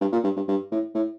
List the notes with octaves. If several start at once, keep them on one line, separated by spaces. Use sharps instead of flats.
G2
A#2
G2
G2
G2
A2
A2